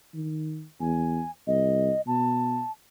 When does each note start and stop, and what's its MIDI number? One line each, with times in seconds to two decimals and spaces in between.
0.14 0.64 51
0.81 1.22 40
0.81 1.31 80
1.47 1.91 36
1.47 2.01 75
2.07 2.61 47
2.07 2.71 81